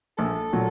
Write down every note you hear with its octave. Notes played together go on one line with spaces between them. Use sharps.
A#1 A4
A#2 F#3